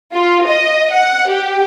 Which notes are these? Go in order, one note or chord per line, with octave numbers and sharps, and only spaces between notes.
F4
D#5
F#5
G4